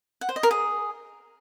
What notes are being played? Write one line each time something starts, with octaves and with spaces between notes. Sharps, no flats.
F#5
C5
D#5
A#4
G#4